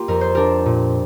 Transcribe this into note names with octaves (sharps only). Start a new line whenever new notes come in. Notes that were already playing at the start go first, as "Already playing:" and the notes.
Already playing: A#3 F4 G4
F2 A#4
C5
D4 G4 A#4
A#2